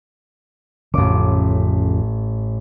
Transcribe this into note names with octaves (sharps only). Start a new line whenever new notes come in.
A1 F2 C#3 D6